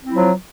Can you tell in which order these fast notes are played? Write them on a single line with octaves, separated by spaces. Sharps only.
C4 E4 F#3 F3